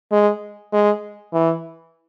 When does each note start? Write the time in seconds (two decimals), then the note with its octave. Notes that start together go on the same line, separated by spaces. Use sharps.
0.12 G#3
0.73 G#3
1.34 E3